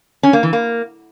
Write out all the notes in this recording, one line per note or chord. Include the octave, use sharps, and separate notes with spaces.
C#4
A#3
E3
A#3